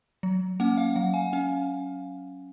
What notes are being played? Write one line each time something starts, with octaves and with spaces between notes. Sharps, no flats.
F#3
A#3 C#4 F#5
F5
F#3 F#5
F5 G#5
C#4 F5